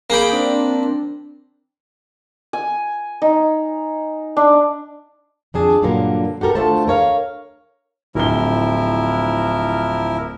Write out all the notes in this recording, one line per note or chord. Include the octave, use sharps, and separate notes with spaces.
A#3 G#4 B5 G6 D7
C4 D4
G#5
D#4
D4
F2 D4 G#4 A5
G2 A#2 D3 F#3 A#3
F#4 G4 A4 A#4
D2 D3 A3 F4 C5 A5
A#4 C#5 F5
D1 F3 E4 A#4 G7